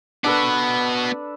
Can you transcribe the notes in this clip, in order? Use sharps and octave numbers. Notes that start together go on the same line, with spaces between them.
B3 D4 F#4 A4 B4